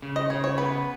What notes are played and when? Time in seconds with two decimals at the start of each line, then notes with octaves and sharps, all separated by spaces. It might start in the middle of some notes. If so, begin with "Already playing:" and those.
0.02 C#3
0.16 D#5
0.30 C#3 C#5
0.44 C#5
0.57 B3 B4